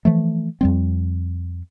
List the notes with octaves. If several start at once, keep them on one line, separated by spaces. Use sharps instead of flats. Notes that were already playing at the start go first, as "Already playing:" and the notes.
E3 F3 A3
F2 G3 C4